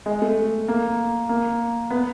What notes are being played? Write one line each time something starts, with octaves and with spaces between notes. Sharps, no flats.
G#3
A3
A#3
A#3
B3